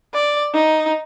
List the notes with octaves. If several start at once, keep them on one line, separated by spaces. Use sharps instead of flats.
D5
D#4